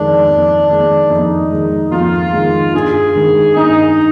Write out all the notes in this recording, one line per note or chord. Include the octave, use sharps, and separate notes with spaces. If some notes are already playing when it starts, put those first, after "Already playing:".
Already playing: F2 D#3 G#3 D4
F2
D#3 G#3
F2 D#4
D#3 G#3
F2 F4
D#3 G#3
G2 G#4
D#3 G#3
G2 D#4